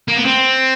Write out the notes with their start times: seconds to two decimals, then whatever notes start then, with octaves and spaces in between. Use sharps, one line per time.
0.08 A#3
0.16 B3
0.25 C4